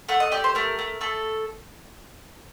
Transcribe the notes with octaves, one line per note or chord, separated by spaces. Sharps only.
A3 F#5
D#5
G4 D5
C5
A3 A#4
A3
A3 A4